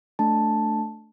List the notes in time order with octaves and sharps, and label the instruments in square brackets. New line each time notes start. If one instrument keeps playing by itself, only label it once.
[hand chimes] A3 D4 A5